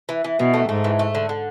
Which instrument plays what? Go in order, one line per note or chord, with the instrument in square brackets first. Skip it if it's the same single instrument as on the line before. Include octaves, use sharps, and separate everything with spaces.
[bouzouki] E3
E3
[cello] B2 [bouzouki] E3
[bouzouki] A3
[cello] G#2 [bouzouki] A3
[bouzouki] E3
A3
D3
D3